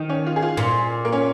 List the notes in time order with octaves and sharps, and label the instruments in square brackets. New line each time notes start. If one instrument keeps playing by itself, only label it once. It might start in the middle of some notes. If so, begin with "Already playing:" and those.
Already playing: [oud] D#3
[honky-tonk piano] C#4
F4
G#4
F4
[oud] A#2 [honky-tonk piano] F4
[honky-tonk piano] A#3
C#4